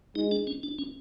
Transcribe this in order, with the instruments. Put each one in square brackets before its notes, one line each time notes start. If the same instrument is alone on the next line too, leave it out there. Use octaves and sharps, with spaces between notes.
[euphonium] G#3 [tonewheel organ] D#4
[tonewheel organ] D4
C#4
D4
C#4